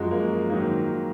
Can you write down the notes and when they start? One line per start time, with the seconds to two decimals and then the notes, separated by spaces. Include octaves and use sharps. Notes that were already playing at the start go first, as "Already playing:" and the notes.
Already playing: F#2 F3 G#3 F#4
0.11 A#3
0.50 G#2 D#3 F#3 A#3